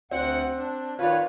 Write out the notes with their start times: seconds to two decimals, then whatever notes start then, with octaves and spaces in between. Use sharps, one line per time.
0.11 D2 C4 F#5
0.56 D4
0.99 D#3 F4 B4 C#5 D5